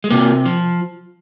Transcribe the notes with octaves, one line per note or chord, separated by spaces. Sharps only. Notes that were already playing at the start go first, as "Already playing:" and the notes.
G#3
C3 A#3
F3